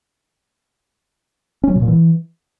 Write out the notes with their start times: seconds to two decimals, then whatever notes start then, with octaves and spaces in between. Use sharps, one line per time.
1.64 C#4
1.70 F#3
1.76 B2
1.82 A#2
1.88 E3